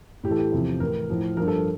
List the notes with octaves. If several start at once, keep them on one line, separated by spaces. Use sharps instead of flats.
A2 G4
E3 A4
G4
E2 C3 F3
A2 E3 A#4
A2 F3
G2 F3 A#4
A4
A#4